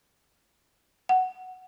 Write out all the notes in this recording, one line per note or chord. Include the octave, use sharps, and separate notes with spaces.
F#5